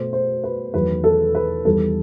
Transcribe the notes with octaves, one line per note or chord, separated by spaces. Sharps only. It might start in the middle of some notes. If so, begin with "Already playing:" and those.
Already playing: B2 A3 C5
C5
B4
E2 D#3 F#3 A3 B4
A4
B4
E2 D#3 G3 A4